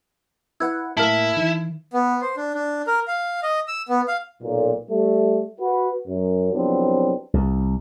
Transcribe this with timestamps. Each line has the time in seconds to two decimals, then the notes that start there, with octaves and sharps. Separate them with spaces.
0.60 E4 B4 F#5 E6 G#6
0.97 A2 A#3 E4 A5 F6
1.37 D#3 E3
1.93 B3
2.22 C5
2.37 D4
2.54 D4
2.87 A#4
3.08 F5
3.43 D#5
3.68 E6
3.89 B3
4.08 F5
4.42 B1 A#2
4.90 G3 A3
5.60 F#4 B4
6.08 F#2
6.53 C2 F3 F#3 B3 C4 D4
7.34 C2